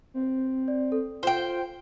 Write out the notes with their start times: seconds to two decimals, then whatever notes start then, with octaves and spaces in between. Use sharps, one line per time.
0.14 C4
0.68 D5
0.92 A4
1.23 F4 C5 G5